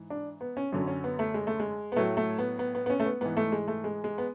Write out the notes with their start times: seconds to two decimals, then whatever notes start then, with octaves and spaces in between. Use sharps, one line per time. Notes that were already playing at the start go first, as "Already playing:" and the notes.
Already playing: G#2 E3
0.10 D4
0.41 B3
0.57 C#4
0.72 F#2 D3 F#3 C#4
0.87 C#4
1.04 B3
1.19 A3
1.34 G#3
1.47 A3
1.60 G#3
1.92 B3
1.96 A2 F#3 A3
2.17 A3
2.38 B3
2.59 B3
2.75 B3
2.86 B3
2.90 C#4
3.00 A3
3.06 B3
3.21 G#2 E3 B3
3.37 A3
3.52 G#3
3.68 A3
3.84 G#3
4.04 G#3
4.18 B3